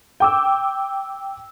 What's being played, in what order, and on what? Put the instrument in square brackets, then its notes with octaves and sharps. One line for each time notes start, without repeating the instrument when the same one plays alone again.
[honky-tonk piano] G5 D6 E6